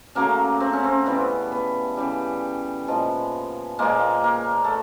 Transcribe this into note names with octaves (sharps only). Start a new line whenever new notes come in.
C#3 F#3 A3 A#3
C4
C#4
C4
C#3 E3 G3 B3
B3
C#3 E3 G3
A#2 F3 G#3
A#2 F3 G#3 A#3
A#3
A3